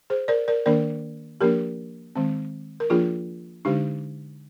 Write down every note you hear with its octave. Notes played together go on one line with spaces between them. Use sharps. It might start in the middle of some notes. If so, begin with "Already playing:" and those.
G#4 C5
A#4 D5
A#4 D5
D#3 A#3 D4 A#4 D5
F3 A#3 D4 G4 A#4
D#3 G#3 C4
A#4
F3 A#3 D4 F4 G#4
D3 G#3 D4 D#4 G4